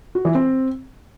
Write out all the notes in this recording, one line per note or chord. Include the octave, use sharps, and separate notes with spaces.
F#4
E3
C4